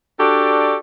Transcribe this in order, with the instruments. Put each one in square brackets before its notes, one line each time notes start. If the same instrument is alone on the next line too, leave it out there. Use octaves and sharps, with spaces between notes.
[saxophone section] D4 F#4 G4 A4 D5